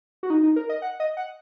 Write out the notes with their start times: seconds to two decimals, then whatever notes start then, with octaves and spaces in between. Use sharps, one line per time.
0.23 F#4
0.30 D#4
0.43 D#4
0.56 A#4
0.69 D#5
0.82 F#5
1.00 D#5
1.17 F#5